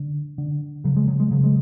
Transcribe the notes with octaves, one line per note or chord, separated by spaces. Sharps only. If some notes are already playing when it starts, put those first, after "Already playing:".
Already playing: D3
D3
C#3 F#3
G#3
F#3
G#3
C#3 F#3
G#3